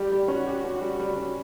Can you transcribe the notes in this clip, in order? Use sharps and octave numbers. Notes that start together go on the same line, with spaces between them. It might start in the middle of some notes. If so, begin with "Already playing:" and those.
Already playing: G3 G4
G3
C#4 F#4
G4
C#4
G3
G3
C#4